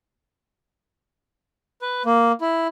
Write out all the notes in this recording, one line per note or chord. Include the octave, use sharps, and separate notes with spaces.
B4
A#3
E4